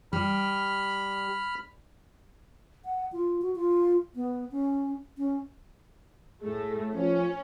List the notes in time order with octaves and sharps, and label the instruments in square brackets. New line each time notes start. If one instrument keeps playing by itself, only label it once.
[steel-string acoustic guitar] G3 [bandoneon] B5 F6
[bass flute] F#5
F4
F#4
F4
B3
C#4
C#4
[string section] A2 A3 [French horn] G#4
[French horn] F3 [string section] C#4